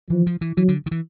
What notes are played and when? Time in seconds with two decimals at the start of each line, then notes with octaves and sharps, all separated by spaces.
0.10 E3 F3
0.27 F3
0.41 E3
0.57 E3 F#3
0.68 D3
0.86 D#3
0.91 E3